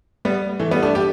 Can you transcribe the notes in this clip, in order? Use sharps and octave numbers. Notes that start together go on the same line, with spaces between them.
G3 B3
E3 A3
G3 B3
A3 D4
D4 G4